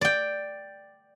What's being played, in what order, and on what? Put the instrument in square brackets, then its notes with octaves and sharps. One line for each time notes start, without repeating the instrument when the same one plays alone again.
[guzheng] D5 G5